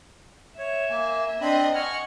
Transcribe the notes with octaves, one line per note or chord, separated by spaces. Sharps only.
C#5 E5
A#3 G#5
C4 D4 D#5 B5 C6
D#5 F#5 G#5 C#6 F6